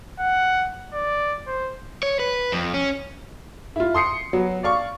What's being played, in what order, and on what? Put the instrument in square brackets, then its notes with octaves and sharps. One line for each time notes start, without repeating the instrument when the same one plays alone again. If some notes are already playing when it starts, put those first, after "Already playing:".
[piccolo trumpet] F#5
D5
C5
[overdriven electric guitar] C#5
B4
F2
C#4
[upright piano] E4 F4
C6 D#6 C7 C#7
F#3 B3
D5 F5 C#6